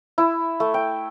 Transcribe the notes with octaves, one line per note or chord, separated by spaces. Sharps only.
E4
A3
G5